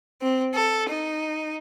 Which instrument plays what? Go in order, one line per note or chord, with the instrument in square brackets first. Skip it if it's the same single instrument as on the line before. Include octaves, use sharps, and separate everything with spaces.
[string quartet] C4
A4
D#4